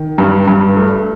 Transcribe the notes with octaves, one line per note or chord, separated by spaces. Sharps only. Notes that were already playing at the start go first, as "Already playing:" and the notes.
Already playing: D#3
G2
G2
A3